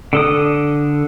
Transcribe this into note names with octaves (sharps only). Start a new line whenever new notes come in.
D3 A4 D#6